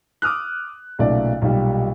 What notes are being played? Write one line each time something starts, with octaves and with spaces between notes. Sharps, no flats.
D6 D#6 F6 F#6
B1 A#2 C#3 A3 D5
B1 A#2 G3